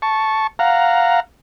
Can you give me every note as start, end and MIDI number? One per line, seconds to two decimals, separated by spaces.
0.02 0.47 81
0.02 0.47 85
0.59 1.20 77
0.59 1.20 78
0.59 1.20 82